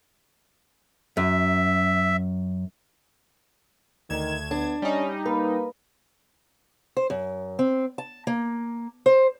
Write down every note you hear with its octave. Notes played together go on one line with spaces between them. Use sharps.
F#2 E5
D2 D#3 G#6 E7
B3 D4
G3 C#4 D#4
A#3 B4
C5
F#2
C4
A5
A#3
C5